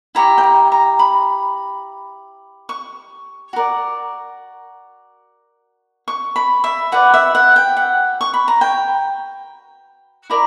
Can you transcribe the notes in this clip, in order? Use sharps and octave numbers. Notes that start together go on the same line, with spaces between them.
E4 G4 C#5 A#5
G5
A#5
A#5
B5
C#6
F#4 A#4 D5
C#6
B5
E5
F#4 B4 D5 F#5
E5
F#5
G5
F#5
C#6
B5
A#5
G5
E4 A#4 D5 A#5